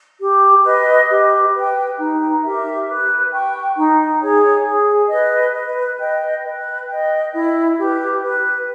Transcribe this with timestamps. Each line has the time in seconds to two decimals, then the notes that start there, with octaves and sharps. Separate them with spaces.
0.19 G4
0.64 B4 D#5
1.09 G4
1.54 B4 G5
1.97 D#4
2.43 G4 A#4 E5
2.86 B4
3.32 G5 C#6
3.76 D#4
4.21 G#4 C#5
4.65 G#4
5.10 B4 D#5
5.54 B4
5.99 D#5 G5
6.44 B4
6.88 D#5 G5
7.33 E4
7.78 G4 B4
8.22 B4